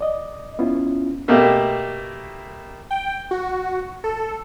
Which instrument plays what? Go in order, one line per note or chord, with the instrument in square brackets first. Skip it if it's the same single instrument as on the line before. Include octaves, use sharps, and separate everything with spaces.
[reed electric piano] D5 D#5
B3 C#4 E4 F4
[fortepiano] B2 A3 A#3 G4
[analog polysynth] G5
F#4
A4